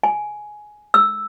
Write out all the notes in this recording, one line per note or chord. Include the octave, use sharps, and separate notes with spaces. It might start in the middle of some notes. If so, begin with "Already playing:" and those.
G#5
E6